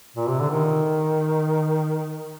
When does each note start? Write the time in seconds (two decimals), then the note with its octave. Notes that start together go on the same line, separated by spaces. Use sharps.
0.17 A#2
0.28 C3
0.40 D3
0.50 D#3